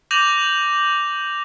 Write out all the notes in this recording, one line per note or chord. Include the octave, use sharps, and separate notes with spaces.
D6 G6 A#6 F7 F#7